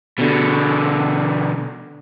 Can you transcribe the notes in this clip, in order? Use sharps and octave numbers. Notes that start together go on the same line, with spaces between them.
B2 D3